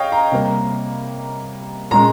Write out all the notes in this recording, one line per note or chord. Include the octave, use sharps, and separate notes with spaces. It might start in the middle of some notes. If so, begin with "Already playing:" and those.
Already playing: C#5 D#5 F5 G5
A#5
C3 G3 A#3
A#2 G#3 C#4 A#5